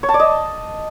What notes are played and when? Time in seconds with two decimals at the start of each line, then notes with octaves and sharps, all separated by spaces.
0.03 C#5
0.09 A5
0.14 D5
0.20 D#5